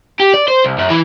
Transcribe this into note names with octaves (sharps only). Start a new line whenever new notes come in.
G4
D5
C5
C2
F#2
E3